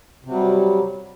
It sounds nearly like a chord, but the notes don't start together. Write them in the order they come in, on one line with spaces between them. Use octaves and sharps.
C3 F#3 G3